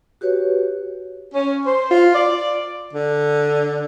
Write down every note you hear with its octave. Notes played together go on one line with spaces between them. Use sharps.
F#4 G4 B4 C#5
C#4
C5
F4
D5
D3